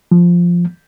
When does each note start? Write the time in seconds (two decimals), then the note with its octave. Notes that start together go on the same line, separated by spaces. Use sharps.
0.11 F3